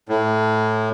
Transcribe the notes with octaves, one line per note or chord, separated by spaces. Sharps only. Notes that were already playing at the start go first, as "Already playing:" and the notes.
A2